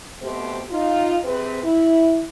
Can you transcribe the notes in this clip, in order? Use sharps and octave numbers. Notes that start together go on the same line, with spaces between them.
B2 A3 C4 G4 C5
D#4 F4
C3 C4 G#4 B4
E4